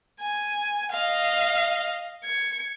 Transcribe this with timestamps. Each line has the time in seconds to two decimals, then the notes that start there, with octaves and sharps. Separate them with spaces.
0.21 G#5
0.92 D#5 F5
2.25 G#6 C#7